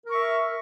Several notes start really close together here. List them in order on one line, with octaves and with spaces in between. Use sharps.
A#4 C#6 E5